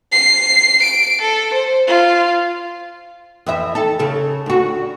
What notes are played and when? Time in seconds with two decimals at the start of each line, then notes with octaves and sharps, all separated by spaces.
0.12 C7
0.82 D7
1.21 A4
1.53 C5
1.88 F4
3.47 F2 E3 E5
3.75 A4
3.99 C#3 A4
4.46 D2 F#4